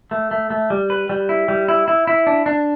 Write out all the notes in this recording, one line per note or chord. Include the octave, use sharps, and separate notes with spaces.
A3
A3
A3
G3
B4
G3
E4
G3
E4
E4
E4
D4
D4